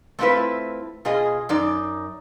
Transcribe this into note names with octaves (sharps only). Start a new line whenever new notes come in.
A3 C4 D4 E4 F4 B4
B2 F4 G#4 D#5
F#2 D#4 D5